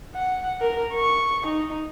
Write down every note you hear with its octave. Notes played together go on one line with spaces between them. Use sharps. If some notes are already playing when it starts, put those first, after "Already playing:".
F#5
A#4
C#6
D#4